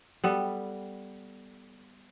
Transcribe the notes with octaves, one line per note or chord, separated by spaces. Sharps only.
G3 B3 A4